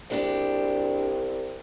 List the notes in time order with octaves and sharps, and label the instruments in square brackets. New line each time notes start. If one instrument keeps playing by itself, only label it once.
[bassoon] C2 [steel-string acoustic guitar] G#3 D4 G4